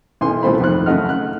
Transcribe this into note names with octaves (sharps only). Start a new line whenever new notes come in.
B1 F#2 E3 G#5 C6
C2 A#2 A3 C5 B5
F2 D#3 F#6
F#2 C#3 A3 D#5 F#5 F6
F#6